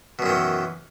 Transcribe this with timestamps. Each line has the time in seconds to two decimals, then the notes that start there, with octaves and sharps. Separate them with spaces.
0.19 B2
0.22 F#2
0.26 D#3
0.29 E3